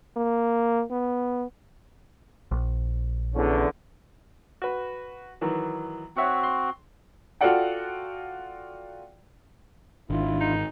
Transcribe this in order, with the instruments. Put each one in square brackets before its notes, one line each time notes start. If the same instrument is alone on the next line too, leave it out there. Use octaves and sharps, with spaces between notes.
[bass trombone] A#3
B3
[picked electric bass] A#1
[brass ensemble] E2 D3 C#4
[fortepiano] F#4 B4
D#3 E3 F#3
[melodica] C4 F#4 [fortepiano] C#5 E5 F#5
[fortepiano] C6
[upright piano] F4 F#4 A4 D5 F#5 G5
[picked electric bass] G#1 [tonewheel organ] D#3 D4 [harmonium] E4 F4
[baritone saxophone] D#4